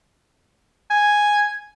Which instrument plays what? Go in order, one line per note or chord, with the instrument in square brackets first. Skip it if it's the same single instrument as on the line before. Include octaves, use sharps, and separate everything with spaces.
[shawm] G#5